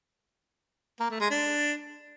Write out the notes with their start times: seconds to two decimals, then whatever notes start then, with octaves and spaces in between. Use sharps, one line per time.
1.00 A#3
1.10 A3
1.20 G#3
1.31 D4